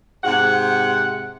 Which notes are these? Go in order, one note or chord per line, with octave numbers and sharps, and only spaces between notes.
G#2 C3 F#5